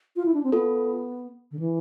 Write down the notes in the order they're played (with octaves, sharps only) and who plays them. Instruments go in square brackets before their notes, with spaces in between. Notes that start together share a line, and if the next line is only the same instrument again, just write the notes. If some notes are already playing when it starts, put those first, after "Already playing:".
[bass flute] F4
E4
D4
C4
[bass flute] B3 [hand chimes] F4 A4
[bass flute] D3
E3